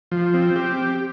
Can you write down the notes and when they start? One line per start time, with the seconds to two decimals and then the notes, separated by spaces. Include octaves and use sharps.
0.12 F3
0.34 C4
0.56 G4